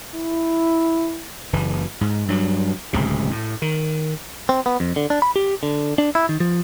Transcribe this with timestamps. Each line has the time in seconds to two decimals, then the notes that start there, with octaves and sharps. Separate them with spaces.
0.15 E4
1.53 F#1 E3
2.01 G#2
2.28 G2 F#3
2.93 D1 C#2 C3
3.31 A2
3.62 D#3
4.49 C4
4.66 B3
4.80 F2
4.96 D3
5.10 D4
5.22 B5
5.36 G4
5.63 D3
5.98 D4
6.15 E4
6.29 D#3
6.40 F3